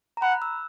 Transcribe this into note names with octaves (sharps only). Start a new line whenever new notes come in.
A#5
F#5 B5
F#6
E6